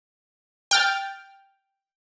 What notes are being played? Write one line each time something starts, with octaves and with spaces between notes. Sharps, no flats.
G5 F6 A6